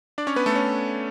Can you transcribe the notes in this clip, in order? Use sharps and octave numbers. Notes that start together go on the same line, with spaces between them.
D4 D5
C#4 C#5
B3 B4
A3 A4
C#4